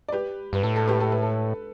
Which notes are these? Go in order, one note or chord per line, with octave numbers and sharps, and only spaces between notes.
D5
G4 B4
G2 B4
A2 A4
A4
G4 B4
A4
B4
A4